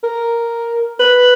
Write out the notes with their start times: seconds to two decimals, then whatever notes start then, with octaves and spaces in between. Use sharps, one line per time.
0.04 A#4
1.00 B4